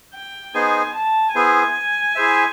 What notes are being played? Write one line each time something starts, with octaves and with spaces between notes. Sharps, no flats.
G5
B3 D#4 G#4 C5 G#5
A5
B3 E4 G#4 C5 G#5
E4 G#4 C5 E5